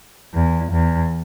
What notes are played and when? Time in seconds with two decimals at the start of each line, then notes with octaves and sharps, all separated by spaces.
0.34 E2
0.72 E2